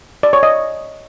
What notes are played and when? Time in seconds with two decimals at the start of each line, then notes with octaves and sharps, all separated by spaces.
0.23 D5
0.33 C#5
0.43 D#5